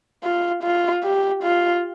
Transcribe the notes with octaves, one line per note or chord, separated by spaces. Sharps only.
F4
F4
G4
F4